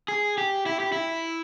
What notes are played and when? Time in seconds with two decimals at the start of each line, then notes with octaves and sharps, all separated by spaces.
0.08 G#4
0.38 G4
0.66 E4
0.80 G4
0.92 E4